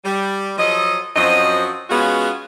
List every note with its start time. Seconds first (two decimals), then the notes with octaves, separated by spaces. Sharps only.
0.04 G3
0.58 F3 F#3 A4 D#5
1.16 F#2 F3 C4 F#4 D#5
1.90 G#3 B3 C#4 F4 F#4 G#4